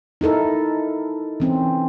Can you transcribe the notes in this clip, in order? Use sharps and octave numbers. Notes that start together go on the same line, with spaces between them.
D#4 E4 A4 A#4
E3 C4 C#4